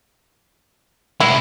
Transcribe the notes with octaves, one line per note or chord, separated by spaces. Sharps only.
C3 G#3 E4